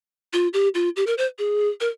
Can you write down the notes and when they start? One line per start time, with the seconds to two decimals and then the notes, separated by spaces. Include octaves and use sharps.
0.33 F4
0.54 G4
0.75 F4
0.96 G4
1.07 A#4
1.18 C5
1.38 G#4
1.81 A#4